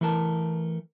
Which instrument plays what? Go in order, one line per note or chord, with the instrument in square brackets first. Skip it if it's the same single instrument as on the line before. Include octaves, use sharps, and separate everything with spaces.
[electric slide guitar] E3 A3 A#4 A5